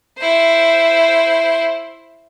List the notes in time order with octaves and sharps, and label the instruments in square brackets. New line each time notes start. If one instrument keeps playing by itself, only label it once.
[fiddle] E4 C5